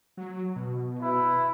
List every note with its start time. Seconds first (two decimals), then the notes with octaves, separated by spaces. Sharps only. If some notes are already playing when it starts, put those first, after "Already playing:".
0.17 F#3
0.56 B2
0.99 E4 B4